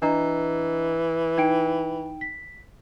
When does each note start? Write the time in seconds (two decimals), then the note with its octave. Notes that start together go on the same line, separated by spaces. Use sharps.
0.02 E3 D4 D#5 A#5
1.38 D#4 G5 D7
2.21 B6